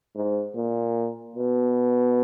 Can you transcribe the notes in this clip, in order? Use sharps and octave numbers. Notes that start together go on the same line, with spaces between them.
G#2
A#2
B2